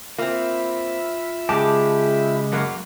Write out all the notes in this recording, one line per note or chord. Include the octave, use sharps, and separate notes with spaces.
A#3 C4 F4 E5 B5
C#3 G#3 G4 A5
F#2 F#3 A#3